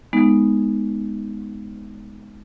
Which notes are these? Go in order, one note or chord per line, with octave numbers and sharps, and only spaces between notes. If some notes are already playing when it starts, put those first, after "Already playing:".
G#3 B3 D#4